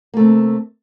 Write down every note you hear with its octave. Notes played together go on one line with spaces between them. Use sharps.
C3 A3 A#3